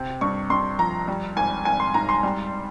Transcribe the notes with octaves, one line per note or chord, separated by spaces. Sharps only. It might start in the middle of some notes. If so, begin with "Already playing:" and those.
Already playing: C3 C4
G2 C#6
G2 C6
F3 A#5
G3
G#1 G#5
G#1 G#5
C6
G#2 A#5
C6
G3